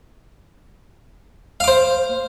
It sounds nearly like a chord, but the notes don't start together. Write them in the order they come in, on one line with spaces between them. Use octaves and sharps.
F5 D6 C5